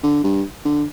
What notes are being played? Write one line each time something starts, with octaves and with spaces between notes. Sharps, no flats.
D3
G2
D3